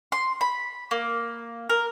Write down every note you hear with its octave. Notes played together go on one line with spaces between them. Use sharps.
C6
B5
A#3
A#4